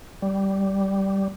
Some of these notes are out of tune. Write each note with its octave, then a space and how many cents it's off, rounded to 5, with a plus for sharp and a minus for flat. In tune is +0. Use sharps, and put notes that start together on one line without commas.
G3 -10